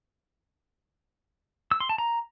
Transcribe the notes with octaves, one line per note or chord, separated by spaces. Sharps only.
E6
C6
A5
A#5